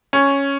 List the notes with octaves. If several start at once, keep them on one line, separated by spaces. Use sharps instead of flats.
C#4